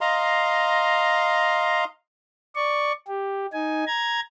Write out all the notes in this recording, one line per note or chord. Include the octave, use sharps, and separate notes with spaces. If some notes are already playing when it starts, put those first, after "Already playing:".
D#5 F5 A#5 C6
D5 C#6
G4
D#4 G#5
A#5 G#6